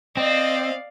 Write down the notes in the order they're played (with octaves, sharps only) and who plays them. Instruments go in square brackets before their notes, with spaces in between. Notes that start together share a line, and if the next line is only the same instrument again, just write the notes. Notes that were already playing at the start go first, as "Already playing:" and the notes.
[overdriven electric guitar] C4 [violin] D5 F5 [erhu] D#5